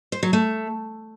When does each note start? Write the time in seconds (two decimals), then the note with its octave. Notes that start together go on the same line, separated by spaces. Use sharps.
0.12 C5
0.23 F#3
0.33 A3